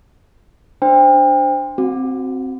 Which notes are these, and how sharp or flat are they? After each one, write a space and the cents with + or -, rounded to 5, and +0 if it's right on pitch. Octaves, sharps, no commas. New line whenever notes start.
D4 +0 C5 -5 G5 +35
C4 +0 F#4 +0